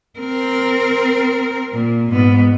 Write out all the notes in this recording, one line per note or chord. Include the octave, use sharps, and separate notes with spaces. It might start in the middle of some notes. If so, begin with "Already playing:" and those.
C4 A#4
A#2
G#2 B3